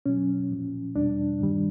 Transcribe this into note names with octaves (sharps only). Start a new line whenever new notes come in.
B2 F#3 C#4
A#2 F3
E2 B2 G3 D4
G2 D#3 G3